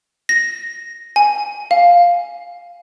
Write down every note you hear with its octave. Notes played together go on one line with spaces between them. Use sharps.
A#6
G#5
F5